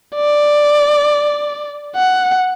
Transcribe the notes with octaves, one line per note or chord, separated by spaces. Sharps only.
D5
F#5